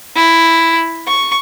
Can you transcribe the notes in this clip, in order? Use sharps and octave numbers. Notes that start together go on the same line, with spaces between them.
E4
C#6